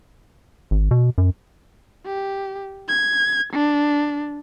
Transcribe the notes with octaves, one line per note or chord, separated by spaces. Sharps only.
G#1
B2
F#2
G4
G#6
D4